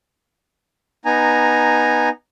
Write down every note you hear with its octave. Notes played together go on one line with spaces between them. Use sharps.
B3 D#4 G#5 A#5